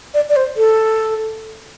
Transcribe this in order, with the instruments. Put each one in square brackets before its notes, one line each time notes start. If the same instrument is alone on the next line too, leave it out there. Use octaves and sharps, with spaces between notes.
[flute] D5
D5
C5
A4